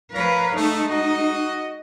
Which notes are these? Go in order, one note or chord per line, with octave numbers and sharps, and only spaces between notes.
F3 A#4 B4 C#5 F5 A#5
G#3 A3 D#4
F#4 D#5